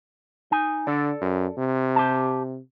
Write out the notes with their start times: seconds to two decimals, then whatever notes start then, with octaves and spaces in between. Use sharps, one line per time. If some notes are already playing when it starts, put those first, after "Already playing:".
0.52 D#4 G#5
0.87 D3 A4 D5
1.21 F#2
1.58 C3
1.95 G4 A5